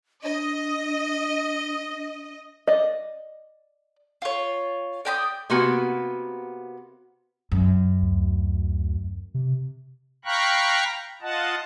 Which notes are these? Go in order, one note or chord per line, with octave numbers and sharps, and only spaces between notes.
D4 D#5
D5 D#5
F4 C#5
D5 G5 B5 D#6
C3 A#3 B3 F#4 G#5
F#2
D2
C3
F5 G5 A#5 B5 C#6 F#6
F4 D#5 F#5 A5